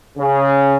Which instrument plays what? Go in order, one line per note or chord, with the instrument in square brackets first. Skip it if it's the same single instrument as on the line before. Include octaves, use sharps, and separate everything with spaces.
[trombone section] C#3